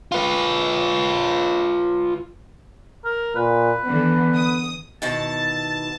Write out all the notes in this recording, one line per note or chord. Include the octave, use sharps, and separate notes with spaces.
F4 B4
A#4
A#2 B4
D3 E3 B3
D#6
B2 D#3 E3 A5 A6